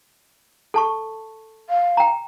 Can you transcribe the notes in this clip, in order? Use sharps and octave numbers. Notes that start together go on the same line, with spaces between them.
A4 A5 C#6
F5
G5 A#5